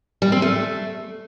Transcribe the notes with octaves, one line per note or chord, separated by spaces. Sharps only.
G3
C4
A3